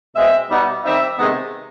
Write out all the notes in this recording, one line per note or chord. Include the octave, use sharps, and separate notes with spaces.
B2 G#3 C4 E5
B2 G3 B3 D#4
D#3 G3 C4 D#4 E5
C3 D#3 G#3 B3 D#4